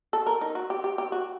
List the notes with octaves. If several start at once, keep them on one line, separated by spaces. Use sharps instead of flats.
A4
A#4
D#4
F#4
G4
G4
G4
F#4